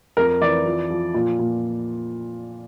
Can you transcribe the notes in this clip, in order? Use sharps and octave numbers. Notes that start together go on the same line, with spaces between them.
F2 A#4
E3 D5
F3
F3
A#2
A#2